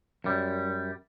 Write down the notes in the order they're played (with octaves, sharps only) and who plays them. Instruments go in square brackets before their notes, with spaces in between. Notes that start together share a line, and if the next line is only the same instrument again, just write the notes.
[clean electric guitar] F#2 G3